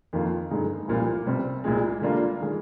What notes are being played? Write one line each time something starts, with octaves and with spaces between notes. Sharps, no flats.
F2 D#3 A#3 F4
G2 D3 G#3 D#4
C2 A#2 F3 A#3 F4
C3 G3 C4
C2 A#2 G#3
D3 G3 A#3 D4 F4
D#3 G#3